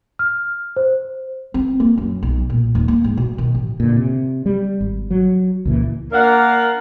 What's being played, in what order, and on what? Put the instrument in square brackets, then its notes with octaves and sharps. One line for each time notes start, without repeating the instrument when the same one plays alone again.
[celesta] F6
C5
[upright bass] C4
A#3
F#2
B1
A#2
D#2
A#3
G#2
B2
D#3
A1
[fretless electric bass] A#2 D3
C3
G3
G#1
F#3
C#2 A#2 E3
[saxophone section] A#3 D4 A#4 F5 F#5